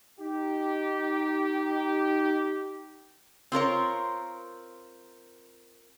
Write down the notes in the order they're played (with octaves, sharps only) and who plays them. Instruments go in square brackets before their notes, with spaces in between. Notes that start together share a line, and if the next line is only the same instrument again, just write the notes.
[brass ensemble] D#4 G4
[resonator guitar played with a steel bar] C4 F4 A#4 C#5